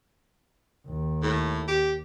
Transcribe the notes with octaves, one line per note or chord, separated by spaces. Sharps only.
D#2
A2
G4